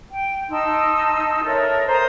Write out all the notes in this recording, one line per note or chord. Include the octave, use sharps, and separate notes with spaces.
G5
D#4 A5 C6 E6
A4 A#4 C#5 E5
C5 A#5 D#6